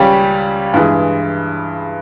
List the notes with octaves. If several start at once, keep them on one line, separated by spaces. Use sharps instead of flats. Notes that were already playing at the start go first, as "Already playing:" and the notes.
Already playing: C#2 C#3 G3 C#4 G4
G2 E3 G#3